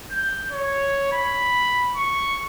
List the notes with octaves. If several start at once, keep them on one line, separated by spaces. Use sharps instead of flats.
G6
C#5
B5
C#6